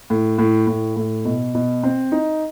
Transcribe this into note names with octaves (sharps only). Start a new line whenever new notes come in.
A2
A2
A2
A2
B2
B2
C4
D#4